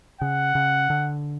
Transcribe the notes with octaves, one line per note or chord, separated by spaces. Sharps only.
C#3 F#5
C#3
D3